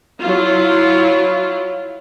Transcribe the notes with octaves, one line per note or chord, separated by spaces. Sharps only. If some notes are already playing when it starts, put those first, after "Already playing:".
F#3 E4 F4